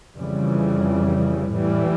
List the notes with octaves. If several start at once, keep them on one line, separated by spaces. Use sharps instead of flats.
F2 C#3 E3 G3
A2 E3 G3